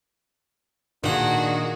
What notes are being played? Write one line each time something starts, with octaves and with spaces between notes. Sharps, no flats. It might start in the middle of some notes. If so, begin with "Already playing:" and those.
A#2 D#3 D4 F#4 G#4 F#5